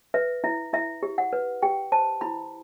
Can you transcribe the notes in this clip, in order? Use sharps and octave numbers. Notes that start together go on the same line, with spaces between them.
B4 E5
E4 E5
E4 E5
G4
F#5
B4
G4 G5
C5 A5
E4 B5